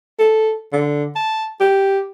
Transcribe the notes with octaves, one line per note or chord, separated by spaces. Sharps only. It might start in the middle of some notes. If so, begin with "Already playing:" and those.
A4
D3
A5
G4